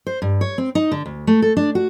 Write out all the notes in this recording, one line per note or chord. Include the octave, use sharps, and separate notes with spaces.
C5
G2
C#5
C4
D#4
D3
D2
A3
A4
D4
F#4